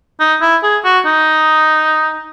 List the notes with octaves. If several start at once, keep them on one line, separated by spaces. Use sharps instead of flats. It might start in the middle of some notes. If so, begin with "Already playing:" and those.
D#4
E4
G#4
F#4
D#4